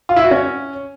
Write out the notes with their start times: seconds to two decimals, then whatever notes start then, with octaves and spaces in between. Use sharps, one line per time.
0.09 F4
0.16 E4
0.24 F#4
0.31 C#4